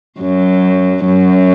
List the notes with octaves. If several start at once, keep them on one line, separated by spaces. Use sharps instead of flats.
F#2 F#3
F#2 F#3